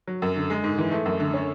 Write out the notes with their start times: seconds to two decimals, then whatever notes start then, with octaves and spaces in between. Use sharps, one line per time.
0.08 F#3
0.22 F#2
0.36 D3
0.50 G#3
0.64 G#2
0.79 E3
0.92 A3
1.06 F#2
1.20 D3
1.34 C#4